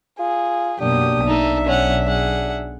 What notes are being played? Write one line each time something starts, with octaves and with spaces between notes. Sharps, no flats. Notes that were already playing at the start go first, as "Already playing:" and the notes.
F4 G#4
F#2 B2 A#3 D4 G4 D#6
B1 D#4 A4 E5
C#4 F#5
G#4 F#5